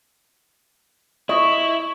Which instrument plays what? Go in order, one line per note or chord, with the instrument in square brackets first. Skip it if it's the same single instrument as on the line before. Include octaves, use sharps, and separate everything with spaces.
[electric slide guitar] E4 [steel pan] D#5 [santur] C#6